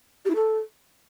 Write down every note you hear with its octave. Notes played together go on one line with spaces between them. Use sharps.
G4
E4
A4